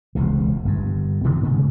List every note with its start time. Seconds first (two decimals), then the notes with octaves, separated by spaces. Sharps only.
0.15 E1 C#2 C3
0.65 G1 G2
1.24 G2 B2 D#3 E3
1.43 G#2 C#3